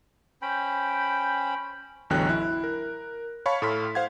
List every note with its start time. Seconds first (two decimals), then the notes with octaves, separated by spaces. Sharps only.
0.42 C#4 C5 G5 B5
2.10 A1 E2 D3 F#3 G5 F#6
2.29 E4
2.63 A#4
3.46 C#5 F5 A5 B5 C#6
3.62 A2 A3 A4 C6 F6 B6
3.95 C5 F5 F#5 G#6